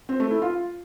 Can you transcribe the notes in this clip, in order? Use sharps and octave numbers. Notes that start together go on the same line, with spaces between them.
C4
A3
E4
F4